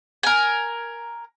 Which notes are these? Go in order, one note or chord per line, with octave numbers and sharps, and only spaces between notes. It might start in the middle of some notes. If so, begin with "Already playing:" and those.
A#4 G#5